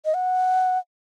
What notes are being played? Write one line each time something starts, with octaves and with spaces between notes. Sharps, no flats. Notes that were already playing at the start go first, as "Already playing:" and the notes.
D#5
F#5